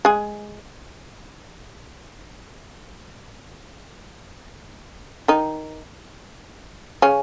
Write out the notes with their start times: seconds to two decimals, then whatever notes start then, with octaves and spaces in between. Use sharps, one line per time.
0.05 G#3 G#4
5.28 D#3 D#4
7.02 C#3 C#4